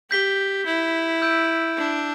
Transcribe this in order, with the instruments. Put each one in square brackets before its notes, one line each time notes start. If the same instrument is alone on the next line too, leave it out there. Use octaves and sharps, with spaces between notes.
[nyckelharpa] G4 [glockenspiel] G6 B6 G7
[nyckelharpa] E4
[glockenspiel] E6 G6 D7
[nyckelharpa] D4